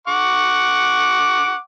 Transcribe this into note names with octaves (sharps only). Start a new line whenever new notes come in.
F#5 C#6 D6